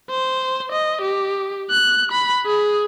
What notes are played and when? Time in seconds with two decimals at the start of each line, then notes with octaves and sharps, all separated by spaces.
0.10 C5
0.72 D#5
1.01 G4
1.70 F#6
2.12 B5
2.46 G#4